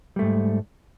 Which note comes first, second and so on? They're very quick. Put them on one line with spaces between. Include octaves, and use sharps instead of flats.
G3 A3 G#2